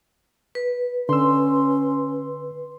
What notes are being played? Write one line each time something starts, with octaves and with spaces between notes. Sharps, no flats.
B4
D3 C#4 C6 E6